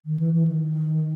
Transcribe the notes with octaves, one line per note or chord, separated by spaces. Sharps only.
D#3
E3
E3
D#3